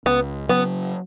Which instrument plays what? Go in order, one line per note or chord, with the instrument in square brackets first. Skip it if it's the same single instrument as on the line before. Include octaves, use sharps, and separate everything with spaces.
[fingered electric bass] C#2 [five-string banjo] B3
[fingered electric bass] C#3 F#3 [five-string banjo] B3